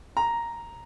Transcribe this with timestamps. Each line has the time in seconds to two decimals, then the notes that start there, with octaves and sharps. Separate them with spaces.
0.17 A#5